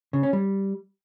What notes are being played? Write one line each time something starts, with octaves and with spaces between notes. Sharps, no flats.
C#3
C#4
G3